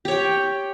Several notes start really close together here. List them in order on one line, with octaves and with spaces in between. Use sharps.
G4 C#5 G5